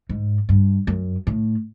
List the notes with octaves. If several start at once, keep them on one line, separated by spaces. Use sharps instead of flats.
G#2
G2
F#2
A2